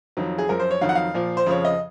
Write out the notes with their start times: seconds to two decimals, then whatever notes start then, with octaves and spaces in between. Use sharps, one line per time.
0.17 F2 D#3 F#3
0.38 G#4
0.49 F#2 F3 A#4
0.60 C5
0.71 C#5
0.81 F2 D#3 F#3 F5
0.89 F#5
0.95 F5
1.14 A#2 F3
1.37 C5
1.46 F2 C#3 F3 C#5
1.65 D#5